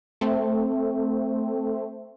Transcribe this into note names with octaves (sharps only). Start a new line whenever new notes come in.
A3 C4